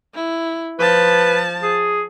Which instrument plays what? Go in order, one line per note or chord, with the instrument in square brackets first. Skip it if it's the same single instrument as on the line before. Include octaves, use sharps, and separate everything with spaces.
[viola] E4
[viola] F3 A5 [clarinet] B4
[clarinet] G#4